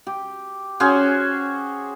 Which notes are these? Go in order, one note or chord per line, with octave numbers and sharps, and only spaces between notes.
G4
C#4 F#4 G#4 C5